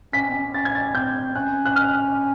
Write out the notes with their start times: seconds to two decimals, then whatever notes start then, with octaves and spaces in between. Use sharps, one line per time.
0.13 C#4 B6
0.30 C4
0.34 C#4
0.54 C#4 A6
0.65 G#6
0.75 A6
0.95 C4 G6
1.35 C#4 F#6
1.65 F#6
1.76 F6